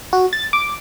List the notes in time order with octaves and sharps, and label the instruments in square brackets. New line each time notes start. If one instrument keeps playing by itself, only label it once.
[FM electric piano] F#4
A6
D6